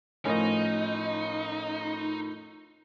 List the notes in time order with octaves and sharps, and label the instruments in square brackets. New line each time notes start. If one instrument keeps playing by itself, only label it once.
[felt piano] A2 F3 A#4 [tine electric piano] C#4 D#5 [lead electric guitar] D#4